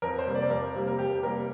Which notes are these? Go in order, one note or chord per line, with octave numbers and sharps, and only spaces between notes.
F2 A#4
C5
C3 G3 A#3
D5
F2 A#4
C3 G3 A#3
A#4
F2 G4
C3 G3 A#3 A#4